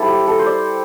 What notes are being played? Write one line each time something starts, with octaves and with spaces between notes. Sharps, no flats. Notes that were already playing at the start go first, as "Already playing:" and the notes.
Already playing: G3 E4 A4 C5 D5
G4
A4
C5
D5